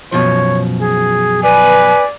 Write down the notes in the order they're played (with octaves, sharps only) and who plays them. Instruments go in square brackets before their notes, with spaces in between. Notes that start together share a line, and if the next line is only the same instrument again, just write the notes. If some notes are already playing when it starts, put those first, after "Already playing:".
[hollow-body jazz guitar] F#2 B2 F3 [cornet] C#5
[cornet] G#4
[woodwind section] B4 [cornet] D5 [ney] G#5